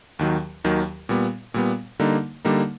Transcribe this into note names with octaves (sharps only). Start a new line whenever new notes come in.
D#2 D#3 F#3
D#2 D#3 F#3
A#2 G3 B3
A#2 G3 B3
D3 G3 A#3 D#4
D3 G3 A#3 D#4